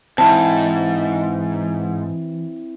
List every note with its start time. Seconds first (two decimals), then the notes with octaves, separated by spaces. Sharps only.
0.18 D#2 G#2 E3 C4 E4 A5